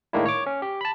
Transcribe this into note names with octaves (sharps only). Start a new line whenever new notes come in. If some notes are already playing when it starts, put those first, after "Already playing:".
A2 D#3 G#3 A#3 D4 E4
C#5 D6
C#4
G4
A5 B5